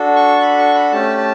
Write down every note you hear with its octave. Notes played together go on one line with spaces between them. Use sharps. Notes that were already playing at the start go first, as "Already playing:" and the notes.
Already playing: D4 F#4 A4
C#6
B5
C#6
B5
A3 C#4 G4 A5
A5